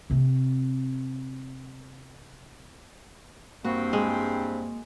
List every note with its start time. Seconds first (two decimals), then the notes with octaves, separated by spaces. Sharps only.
0.10 C3 C4
3.65 G2 A#3 C4 F#4
3.93 G#3